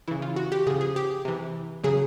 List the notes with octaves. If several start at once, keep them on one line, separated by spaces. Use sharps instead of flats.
C#3 E3 E4
F4
F#4
G4
C#3 F3 G#4
G#4
G4
C3 E3
C#3 F#3 G#4